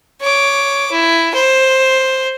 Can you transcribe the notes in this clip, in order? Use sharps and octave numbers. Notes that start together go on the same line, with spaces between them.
C#5 D6
E4
C5